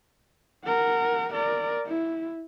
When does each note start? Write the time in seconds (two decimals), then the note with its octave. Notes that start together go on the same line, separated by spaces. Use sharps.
0.65 A#4 F#5
1.33 A#4 D5
1.86 E4